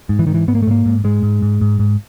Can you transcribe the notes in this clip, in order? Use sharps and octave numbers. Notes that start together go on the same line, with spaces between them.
G#2
E3
G#2 D#3
E3
G#2 B3
A#3
A3
G#2 A#3
G#2
G#2 G#3
G#2
G#2
G#2
G#2